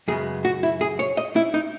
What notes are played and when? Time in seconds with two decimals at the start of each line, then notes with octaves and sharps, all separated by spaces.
0.08 F#2 C#3 G#3 B3 G#4
0.45 F#4
0.63 E4
0.81 G#4
0.99 C#5
1.17 D#5
1.36 E4
1.54 D#4